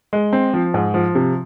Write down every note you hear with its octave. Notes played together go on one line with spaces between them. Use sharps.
G#3
C4
F3
G#2
F3
C3